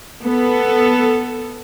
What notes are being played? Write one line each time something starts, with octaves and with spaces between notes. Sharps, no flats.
B3 A4